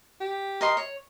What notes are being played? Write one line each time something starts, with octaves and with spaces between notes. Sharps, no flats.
G4
A#4 D#5 C6
C#5